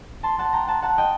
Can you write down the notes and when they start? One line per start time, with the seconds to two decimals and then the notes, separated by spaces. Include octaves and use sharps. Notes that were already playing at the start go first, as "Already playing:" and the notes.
0.23 A5 C6
0.39 F#5 A5
0.53 G5 A#5
0.67 F#5 A5
0.82 F#5 A5
0.98 D#5 G5